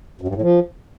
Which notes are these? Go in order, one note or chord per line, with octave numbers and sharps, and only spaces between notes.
F#2
G2
A2
F3